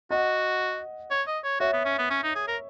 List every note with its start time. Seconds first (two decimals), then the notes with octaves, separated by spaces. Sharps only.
0.11 F#4 D#5 F#5
1.11 C#5
1.27 D#5
1.44 C#5
1.60 F#4 C#5 E5
1.73 B3
1.85 C#4
1.98 B3
2.10 C#4
2.23 D#4
2.35 G#4
2.48 A#4